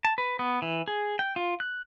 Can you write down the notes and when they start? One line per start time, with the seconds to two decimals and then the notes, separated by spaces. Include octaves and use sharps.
0.05 A5
0.18 B4
0.39 B3
0.62 E3
0.88 G#4
1.19 G5
1.36 F4
1.60 F#6